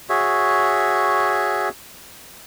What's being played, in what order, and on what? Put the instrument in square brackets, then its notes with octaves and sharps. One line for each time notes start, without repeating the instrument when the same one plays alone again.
[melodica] F#4 G#4 C#5 E5